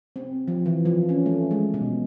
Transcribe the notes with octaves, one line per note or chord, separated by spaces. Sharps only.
C4
F3
E3
F3
C#4
A3
G#3
B2